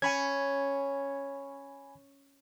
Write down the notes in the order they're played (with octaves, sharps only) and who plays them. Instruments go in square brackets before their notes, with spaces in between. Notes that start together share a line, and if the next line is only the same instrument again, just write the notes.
[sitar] C#4 [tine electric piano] G#5 B5 G#6